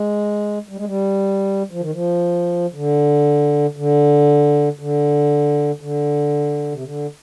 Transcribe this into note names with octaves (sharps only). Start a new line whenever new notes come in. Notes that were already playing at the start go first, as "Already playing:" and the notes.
Already playing: G#3
G3
G#3
G3
F3
D#3
F3
D3
D3
D3
D3
C3
D3